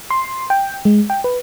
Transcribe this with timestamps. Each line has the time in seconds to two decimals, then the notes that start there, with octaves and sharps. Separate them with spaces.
0.10 C6
0.50 G5
0.85 G#3
1.10 G5
1.24 B4